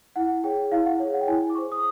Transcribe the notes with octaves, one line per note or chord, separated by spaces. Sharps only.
E4 F#5
G#4 C#5 G5
E4 F5
F#5
G#4 C#5
F#5
G5
E4 G#5
D6
G#4 C5 C#6
D#6